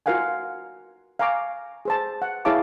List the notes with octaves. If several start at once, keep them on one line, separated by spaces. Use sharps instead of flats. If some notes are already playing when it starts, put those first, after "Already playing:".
F4 F#4 A#4 F5 F#5 G#5
F5 G#5 A#5 C#6 D6
G#4 C5 A5
F#5
E4 G#4 C#5 F5 A5 D6